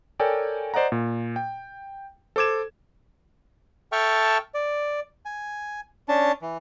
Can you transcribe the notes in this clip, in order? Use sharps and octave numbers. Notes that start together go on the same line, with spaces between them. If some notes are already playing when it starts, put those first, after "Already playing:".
A4 A#4 C#5 D5 G5 G#5
C5 D5 D#5 F#5 A#5
A#2
G5
A4 C5 D6 G#6 E7
A4 E5 G5 A5 C#6 F6
D5
G#5
C#4 D4 A5
E3